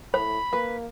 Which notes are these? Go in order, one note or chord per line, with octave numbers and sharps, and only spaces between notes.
A2 C5 B5
A#3 B4